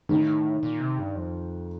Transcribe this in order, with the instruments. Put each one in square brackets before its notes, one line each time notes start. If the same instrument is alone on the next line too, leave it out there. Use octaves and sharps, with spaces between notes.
[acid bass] A2 [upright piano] D#3
[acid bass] A#2
C3
G2
F2